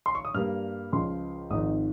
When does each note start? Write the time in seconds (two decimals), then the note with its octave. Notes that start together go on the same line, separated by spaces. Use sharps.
0.06 C6
0.15 C#6
0.25 D#6
0.34 G2 G3 A#3 F6
0.92 C#2 C#3 F3 G#3 C6
1.50 G#1 G#2 F3 C4 D#4 D#6